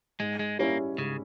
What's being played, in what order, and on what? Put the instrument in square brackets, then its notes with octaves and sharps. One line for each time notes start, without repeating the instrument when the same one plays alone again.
[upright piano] G#2 [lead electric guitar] G#3
[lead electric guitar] G#3
[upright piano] G3 C#4 E4 [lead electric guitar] A#3
[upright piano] G#2 [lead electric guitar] C#3